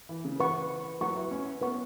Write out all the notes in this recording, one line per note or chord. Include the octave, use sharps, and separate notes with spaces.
E3
C#3
E3 B4 F#5 C#6
F#3 B4 F#5 C#6
E4
C#4
B3 B4 F#5 C#6